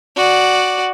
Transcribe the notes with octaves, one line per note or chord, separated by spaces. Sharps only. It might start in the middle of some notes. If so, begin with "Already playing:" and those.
F#4 D5